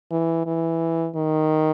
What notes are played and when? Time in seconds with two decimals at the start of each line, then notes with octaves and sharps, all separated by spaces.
0.11 E3
0.46 E3
1.15 D#3